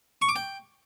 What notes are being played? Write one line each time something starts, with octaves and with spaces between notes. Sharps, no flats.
C#6
D6
G5